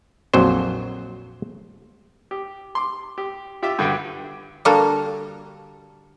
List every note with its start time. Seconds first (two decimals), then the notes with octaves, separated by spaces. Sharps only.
0.34 A#1 F2 F#3 C5
2.31 G4
2.75 C6 D6
3.18 G4
3.63 F4 G4 E5 D6 E6
3.79 G2 D3 F#4 G5
4.65 D3 G3 A#3 F#4 A4